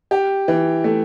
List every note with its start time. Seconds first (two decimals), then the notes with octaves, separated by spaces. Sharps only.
0.11 G4
0.48 E3
0.84 A3